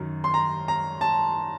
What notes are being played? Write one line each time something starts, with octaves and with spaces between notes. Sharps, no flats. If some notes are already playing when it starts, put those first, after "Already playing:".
Already playing: F#2 D#3
C6
A#5
A#5
A5